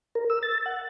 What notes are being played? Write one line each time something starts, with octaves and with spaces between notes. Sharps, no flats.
A#4
E6
A6
F#5